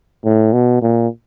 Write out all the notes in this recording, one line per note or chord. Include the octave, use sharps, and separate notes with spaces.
A2
B2
A#2